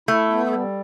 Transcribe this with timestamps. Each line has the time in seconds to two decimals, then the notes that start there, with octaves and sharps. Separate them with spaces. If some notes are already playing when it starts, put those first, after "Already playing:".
0.08 A3 E4
0.30 B3
0.51 G3